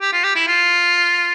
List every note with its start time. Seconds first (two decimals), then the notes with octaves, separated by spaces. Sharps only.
0.01 G4
0.13 F4
0.24 G4
0.36 E4
0.48 F4